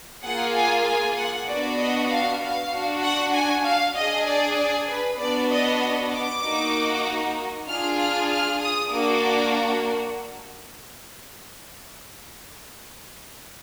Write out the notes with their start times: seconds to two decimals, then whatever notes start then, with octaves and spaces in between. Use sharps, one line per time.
0.23 A#3 F4 G#4 F#5
0.55 G#5
0.85 G#5
1.16 F#5
1.48 B3 D4 F#4 D5
1.79 D#5
2.09 F5
2.40 F5
2.72 D4 F#4
3.02 F#5
3.33 G#5
3.64 F5
3.95 D4 G#4 D#5
4.26 D5
4.57 D5
4.88 B4
5.19 B3 D4 F#4 D5
5.50 D#5
6.12 D6
6.43 A#3 D#4 F#4
7.67 D4 F4 G#4 F6
7.98 F6
8.30 F6
8.60 D#6
8.90 A#3 D4 F#4 D6